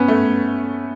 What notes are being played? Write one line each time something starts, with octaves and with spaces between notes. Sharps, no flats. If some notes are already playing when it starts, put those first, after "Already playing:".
Already playing: B3 C#4
A3